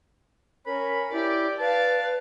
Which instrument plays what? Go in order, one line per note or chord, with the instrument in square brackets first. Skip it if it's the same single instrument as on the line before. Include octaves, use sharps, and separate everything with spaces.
[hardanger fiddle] C#4 [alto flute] A#4 [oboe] B5
[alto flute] E4 [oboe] G4 [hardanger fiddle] D5
[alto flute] B4 [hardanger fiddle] D5 F5 [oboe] A5